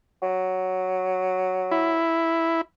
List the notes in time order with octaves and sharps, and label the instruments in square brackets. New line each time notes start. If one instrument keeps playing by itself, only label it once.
[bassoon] F#3
[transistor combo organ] E4